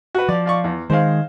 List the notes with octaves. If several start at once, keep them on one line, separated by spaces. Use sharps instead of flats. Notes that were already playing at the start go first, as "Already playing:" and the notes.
F#4 B4
F3 D5
F4 D5 C#6
E2
D#3 G#3 C5 F5